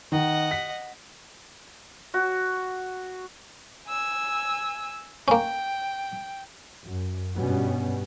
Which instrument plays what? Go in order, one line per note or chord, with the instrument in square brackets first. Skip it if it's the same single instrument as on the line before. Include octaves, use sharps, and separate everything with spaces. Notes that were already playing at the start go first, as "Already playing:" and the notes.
[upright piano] D#3 [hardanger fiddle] D#5 F#5
[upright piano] B6
[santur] F#4
[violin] G#5 E6
[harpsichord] A#3 C#4 [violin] G5
[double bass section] F#2
G2 B2 G3 B3 C#4